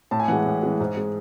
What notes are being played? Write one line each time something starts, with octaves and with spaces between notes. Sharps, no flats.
A2 A5
G#5
E3 G#3 F#5
G#5
A2
E3 G#3
G#2
G#3